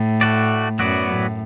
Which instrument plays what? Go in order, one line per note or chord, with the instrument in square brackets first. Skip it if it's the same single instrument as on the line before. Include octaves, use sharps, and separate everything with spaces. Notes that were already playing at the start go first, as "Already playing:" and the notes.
Already playing: [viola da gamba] A2
[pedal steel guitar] A3 F#4 D5
[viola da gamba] F#2 [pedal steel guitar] F#3 B3 F#4 D5
[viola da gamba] A2